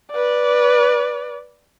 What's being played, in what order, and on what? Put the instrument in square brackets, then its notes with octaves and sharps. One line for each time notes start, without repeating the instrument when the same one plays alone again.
[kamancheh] B4 D5